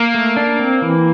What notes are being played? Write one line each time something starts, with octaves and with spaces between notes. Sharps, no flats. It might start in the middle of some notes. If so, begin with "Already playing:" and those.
Already playing: A#3
A3
D4
C4
E3